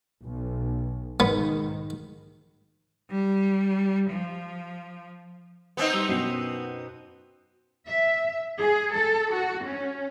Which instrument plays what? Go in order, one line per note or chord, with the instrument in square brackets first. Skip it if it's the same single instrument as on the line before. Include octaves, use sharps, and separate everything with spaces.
[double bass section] B1
[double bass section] G#2 D#3 [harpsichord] B3
[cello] G3
F3
[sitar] B3 C4 D#4
[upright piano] G3 F7 G7
F#2 B2 C7
[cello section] E5
G#4
A4
F#4
C#4